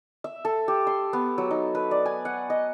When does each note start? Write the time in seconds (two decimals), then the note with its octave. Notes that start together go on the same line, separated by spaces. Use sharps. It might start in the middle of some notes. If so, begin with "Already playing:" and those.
0.24 E5
0.45 A4
0.68 G4
0.87 C6
1.13 B3
1.38 F#3
1.51 D#4
1.75 B4
1.91 D5
2.06 G#5
2.25 F#5
2.50 D#5